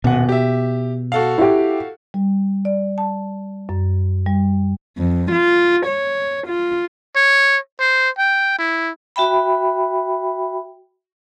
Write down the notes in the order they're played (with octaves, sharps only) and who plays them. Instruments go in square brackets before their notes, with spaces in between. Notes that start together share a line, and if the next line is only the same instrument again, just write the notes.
[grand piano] D#1 F#5 [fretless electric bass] B2
[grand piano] G4 E5
F#4 A4 F5
[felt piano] E4 G4
[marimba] G3
D5
A5
F#2
G3
[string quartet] F2
F4
C#5
F4
[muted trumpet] C#5
C5
G5
E4
[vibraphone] F#4 E5 G5 B5